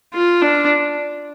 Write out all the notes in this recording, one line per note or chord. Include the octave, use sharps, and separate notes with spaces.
F4
D4